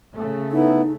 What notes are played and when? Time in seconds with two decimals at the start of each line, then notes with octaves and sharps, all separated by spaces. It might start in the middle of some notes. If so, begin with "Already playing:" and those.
0.14 C#3 A3
0.52 B3 D#4 E4